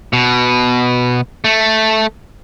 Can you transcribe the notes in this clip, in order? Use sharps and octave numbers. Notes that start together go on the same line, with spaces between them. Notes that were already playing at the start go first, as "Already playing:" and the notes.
B2
A3